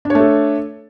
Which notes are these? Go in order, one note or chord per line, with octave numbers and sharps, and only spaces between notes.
A3 D4 A4 C#5